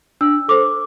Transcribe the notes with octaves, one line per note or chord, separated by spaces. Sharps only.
D4 E6
A4 C5 D6